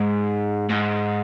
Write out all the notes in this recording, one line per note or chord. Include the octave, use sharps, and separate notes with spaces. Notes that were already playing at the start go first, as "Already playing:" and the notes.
Already playing: G#2
G#2